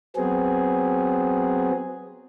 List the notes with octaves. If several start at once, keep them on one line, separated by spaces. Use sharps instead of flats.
F#3 B3 C4 G#4